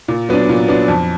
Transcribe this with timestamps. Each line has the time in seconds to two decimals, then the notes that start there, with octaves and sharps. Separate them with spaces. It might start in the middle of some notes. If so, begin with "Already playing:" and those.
0.08 A#2
0.29 F#3 B3 D4
0.49 A#2
0.68 F#3 B3 D4
0.88 F2